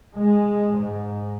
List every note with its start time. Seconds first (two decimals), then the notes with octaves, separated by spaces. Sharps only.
0.15 G#3
0.76 G#2